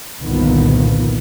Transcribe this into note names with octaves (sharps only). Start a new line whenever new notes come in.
G1 C2 A#2 D#3 F3 B3